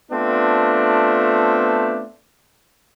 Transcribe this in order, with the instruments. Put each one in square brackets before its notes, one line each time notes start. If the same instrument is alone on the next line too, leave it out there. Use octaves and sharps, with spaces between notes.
[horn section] A3 B3 C4 D4 F4